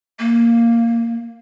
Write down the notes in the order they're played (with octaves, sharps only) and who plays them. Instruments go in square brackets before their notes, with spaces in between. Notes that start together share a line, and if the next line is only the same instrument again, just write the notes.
[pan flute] A#3